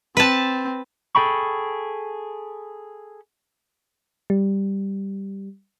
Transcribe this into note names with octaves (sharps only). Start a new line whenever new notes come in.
C4 B4 A5
G#4 A4 G5 B5 C#6
G3